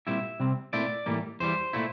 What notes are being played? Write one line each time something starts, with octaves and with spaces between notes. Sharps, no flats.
A#2 G3 C4 E4 E5
C3 G3 C4
A#2 A3 C4 E4 D5
A2 E3 G3 A#3
E2 E3 G3 C5
A#2 A3 E4